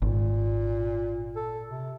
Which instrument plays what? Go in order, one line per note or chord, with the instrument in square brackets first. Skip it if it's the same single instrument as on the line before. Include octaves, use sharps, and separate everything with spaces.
[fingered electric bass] G#1 [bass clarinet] A#2
[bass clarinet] A4
C3